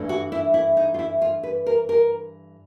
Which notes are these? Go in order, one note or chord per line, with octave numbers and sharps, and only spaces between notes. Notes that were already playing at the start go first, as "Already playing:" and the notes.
Already playing: G2 E3 A3
F#4
E4
E4
D#4
F4
E4
F4
B4
A#4
A#4